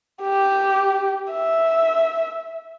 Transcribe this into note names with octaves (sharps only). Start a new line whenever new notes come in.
G4
E5